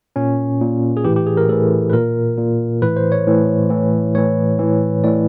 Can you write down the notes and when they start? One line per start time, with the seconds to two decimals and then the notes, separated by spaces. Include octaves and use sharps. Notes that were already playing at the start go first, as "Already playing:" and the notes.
0.16 A#2 C#4
0.61 A#2
0.97 G#4
1.04 A2 E3 G4
1.16 G4
1.26 G#4
1.37 A#4
1.49 A2 E3 A4
1.90 B4
1.93 A#2 A#4
2.38 A#2
2.82 A2 E3 B4
2.97 C5
3.12 C#5
3.26 A2 E3
3.70 A2 E3
4.15 A2 E3 C#5
4.59 A2 E3
5.04 A2 E3 D5